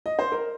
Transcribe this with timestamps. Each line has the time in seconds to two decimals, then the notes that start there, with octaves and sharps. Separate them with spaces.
0.06 D#5
0.19 C5
0.32 A#4